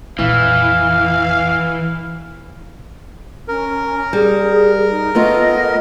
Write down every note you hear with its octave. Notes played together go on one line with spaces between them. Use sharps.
F2 A#2 E3 F5
C#4 A#4
G3 G#4
D#4
A3 B3 F4 D#5